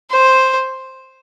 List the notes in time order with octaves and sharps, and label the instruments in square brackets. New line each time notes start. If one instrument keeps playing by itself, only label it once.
[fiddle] C5